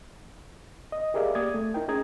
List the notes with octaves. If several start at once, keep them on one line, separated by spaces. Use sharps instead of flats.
D#5
G4 G#4 A#4 D5 E5 F5
A#3 G4 D5 D#6 G#6 A6
A3
D#4 E4 A#4 G5
C#4 D#4 G#4 A#5 D#6 G#6